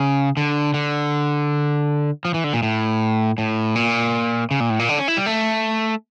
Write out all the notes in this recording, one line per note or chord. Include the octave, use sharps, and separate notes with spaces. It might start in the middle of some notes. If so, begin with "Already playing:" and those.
Already playing: C#3
D3
D3
F3
E3
D3
A#2
A2
A2
A#2
C#3
A#2
A2
A#2
D3
C#4
E4
G3
A3